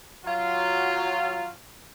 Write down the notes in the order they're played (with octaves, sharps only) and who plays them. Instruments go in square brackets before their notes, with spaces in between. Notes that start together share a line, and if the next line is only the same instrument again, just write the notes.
[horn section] F#3 F4